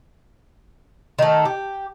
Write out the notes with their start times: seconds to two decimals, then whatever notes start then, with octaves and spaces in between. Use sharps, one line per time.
1.19 D#3 A3
1.45 G4